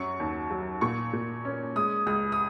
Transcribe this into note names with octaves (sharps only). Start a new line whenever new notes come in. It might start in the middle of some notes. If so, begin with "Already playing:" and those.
Already playing: F#2 F#3 C#4 C#6
D#2
F#3
A#2 C#6
A#2
C#4
G#3 D#6
C#2 D#6
D#6